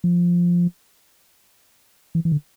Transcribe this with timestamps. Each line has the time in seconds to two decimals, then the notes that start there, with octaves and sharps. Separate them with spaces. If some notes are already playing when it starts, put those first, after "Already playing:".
0.04 F3
2.15 E3
2.25 E3
2.32 D3